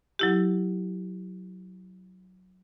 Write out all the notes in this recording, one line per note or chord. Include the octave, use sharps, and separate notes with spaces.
F#3 E4 G4